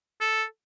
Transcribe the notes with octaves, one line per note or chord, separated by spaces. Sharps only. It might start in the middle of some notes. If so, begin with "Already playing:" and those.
A4